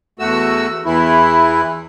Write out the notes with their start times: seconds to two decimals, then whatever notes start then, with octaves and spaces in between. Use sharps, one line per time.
0.19 E2 A3 F#4 E6
0.85 E2 E3 E4